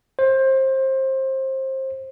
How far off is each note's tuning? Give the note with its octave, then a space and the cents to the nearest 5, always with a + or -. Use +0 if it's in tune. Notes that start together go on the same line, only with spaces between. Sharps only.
C5 +25